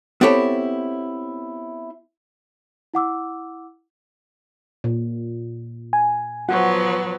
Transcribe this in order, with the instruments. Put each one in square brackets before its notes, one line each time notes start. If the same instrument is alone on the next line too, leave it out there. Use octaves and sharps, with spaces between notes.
[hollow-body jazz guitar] B3 C4 E4 G4 A4 C#5
[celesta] E4 F#5 D6 E6
[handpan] A#2
[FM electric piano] G#5
[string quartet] F3 F#3 B3 [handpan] F#4 [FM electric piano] F#5